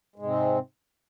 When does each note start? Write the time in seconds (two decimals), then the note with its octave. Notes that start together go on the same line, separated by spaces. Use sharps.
0.16 G#3
0.19 G#2
0.22 C3
0.26 C4